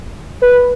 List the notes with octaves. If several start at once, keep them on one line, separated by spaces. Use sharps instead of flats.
B4